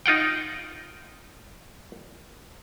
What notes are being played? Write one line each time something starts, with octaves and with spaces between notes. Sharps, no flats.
D#4 F4 F#5 G5